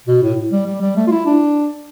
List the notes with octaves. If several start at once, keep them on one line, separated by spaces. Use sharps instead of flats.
B2
A2
G3
G3
G3
A3
F4
E4
D4